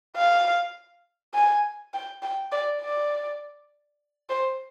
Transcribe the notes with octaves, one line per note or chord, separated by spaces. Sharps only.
F5
G#5
G5
G5
D5
D5
C5